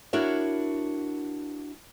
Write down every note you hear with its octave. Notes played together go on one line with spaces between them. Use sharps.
D4 E4 F#4 A#4 C#5